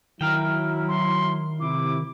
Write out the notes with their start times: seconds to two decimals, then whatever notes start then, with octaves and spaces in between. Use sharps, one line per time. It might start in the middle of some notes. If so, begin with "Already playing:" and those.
0.21 D#3 F#3 E4 A#4 F5 G5
0.88 C6
1.60 C3 E4 D6